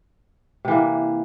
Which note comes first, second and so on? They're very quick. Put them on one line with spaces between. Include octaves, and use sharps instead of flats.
C3 E3 A#3